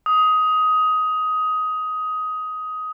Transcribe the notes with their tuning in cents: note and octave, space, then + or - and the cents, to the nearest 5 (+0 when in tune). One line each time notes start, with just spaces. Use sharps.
D#6 +15